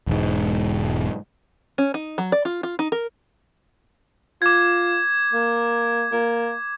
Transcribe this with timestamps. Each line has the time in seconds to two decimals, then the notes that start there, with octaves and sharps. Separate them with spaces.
0.07 E1 G#2
1.78 C#4
1.94 D#4
2.18 F#3
2.32 D5
2.45 F4
2.63 F4
2.79 D#4
2.92 A#4
4.42 F4 D6 G#6
5.33 A#3
6.12 A#3